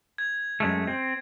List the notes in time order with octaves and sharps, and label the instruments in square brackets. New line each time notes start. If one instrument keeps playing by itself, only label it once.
[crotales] G#6
[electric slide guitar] F#2 G#3 A3
C4